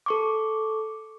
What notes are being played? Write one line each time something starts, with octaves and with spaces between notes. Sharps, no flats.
A4 C#6 D6